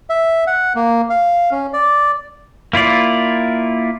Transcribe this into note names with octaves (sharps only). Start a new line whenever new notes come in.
E5
F#5
A#3
F5
C#4
D5
A#3 E4 F4 D5